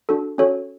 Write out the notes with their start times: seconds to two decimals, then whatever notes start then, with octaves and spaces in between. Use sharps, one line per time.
0.09 D4 F#4 A4
0.38 C#4 F#4 A4 C#5